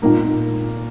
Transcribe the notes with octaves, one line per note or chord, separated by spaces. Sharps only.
A#2 A#3 D#4